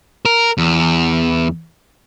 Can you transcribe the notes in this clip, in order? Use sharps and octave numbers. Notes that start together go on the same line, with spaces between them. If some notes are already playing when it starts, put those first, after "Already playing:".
A#4
E2